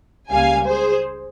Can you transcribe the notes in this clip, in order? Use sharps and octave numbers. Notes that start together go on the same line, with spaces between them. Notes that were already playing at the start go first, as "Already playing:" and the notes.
C#2 C#3 G3 A#3 F5 G#5
G#4 C5